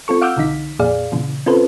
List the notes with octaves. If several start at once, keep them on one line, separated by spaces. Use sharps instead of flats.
C4 F4 A4 C#6
F5 F#5 D6 E6 F6 G6
B1 D3 E3 D#4 B6
A#1 F2 A#2 G#4 D5 F5
A#2 C#3 E3
C4 C#4 F4 A4 B4 C5